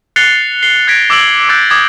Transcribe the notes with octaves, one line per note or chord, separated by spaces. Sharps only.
F#6 A6 C7 C#7 F7 G7
C7 G7
F#6 G#6 A#6 B6 D7
D6 E6 D7 F#7
D6 E6 F#6 G6 A6 D7
D6 D#6 G#6